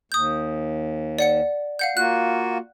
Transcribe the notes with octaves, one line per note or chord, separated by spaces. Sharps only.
D#2 D#6 G6
D5 F#5 C#7
F5 F#5 G6
A#3 F4 F#4 F#6